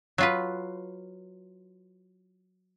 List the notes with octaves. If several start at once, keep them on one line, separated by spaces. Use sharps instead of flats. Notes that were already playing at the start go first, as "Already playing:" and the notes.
F#3 F4 B4